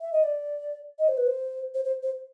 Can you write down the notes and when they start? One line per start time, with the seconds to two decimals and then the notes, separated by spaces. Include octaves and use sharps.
0.01 E5
0.13 D#5
0.23 D5
0.99 D#5
1.08 C5
1.17 B4
1.27 C5
1.74 C5
1.84 C5
2.03 C5